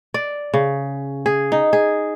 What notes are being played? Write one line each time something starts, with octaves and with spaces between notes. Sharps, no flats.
D5
C#3
G#4
D#4
G#4